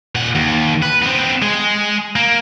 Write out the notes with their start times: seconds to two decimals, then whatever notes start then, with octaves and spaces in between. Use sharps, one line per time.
0.15 A#2 F#5
0.35 D#2
0.82 B4
1.02 B3 C4
1.42 G#3 G#4
2.16 A#3